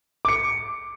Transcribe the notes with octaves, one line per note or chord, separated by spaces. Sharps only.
D6 C#7